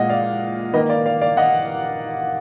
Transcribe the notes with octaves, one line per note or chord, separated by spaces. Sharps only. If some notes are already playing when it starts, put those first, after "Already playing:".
Already playing: A#2 G#3 D#5 F#5
D5 F5
D#3 A#3 B4 D#5
D5 F5
D5 F5
D5 F5
D#5 F#5